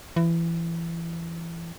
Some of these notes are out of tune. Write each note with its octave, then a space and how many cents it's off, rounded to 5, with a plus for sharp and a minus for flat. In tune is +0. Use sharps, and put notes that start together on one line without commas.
E3 +25